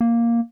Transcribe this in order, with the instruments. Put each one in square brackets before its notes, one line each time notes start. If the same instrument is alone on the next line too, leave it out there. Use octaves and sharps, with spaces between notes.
[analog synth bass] A#3